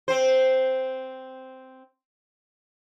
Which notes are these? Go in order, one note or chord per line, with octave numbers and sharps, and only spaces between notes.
C4 C5